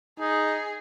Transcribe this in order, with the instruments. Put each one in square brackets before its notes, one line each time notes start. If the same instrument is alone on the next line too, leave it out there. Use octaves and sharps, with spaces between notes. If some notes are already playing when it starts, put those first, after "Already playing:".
[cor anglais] D#4 [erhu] G#4